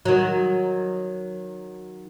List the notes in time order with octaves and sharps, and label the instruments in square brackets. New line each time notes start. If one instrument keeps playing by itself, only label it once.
[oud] D#3 F#3